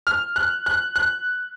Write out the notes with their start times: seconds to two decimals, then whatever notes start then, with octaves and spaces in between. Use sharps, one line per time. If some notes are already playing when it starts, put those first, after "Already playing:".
0.07 F6
0.36 F#6
0.66 F#6
0.96 F#6